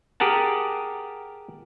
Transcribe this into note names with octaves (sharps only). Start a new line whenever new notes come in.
G4 G#4 A#4 F#5 A5